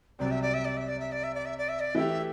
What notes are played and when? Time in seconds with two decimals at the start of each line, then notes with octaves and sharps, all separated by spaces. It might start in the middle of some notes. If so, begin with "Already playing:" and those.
0.19 C2 C3 F#3 C4 D5
0.31 E5
0.42 D5
0.53 E5
0.64 D5
0.76 E5
0.88 D5
0.99 E5
1.11 D5
1.23 E5
1.34 D5
1.45 E5
1.58 D5
1.68 E5
1.80 D5
1.95 E3 A3 E4 G4 E5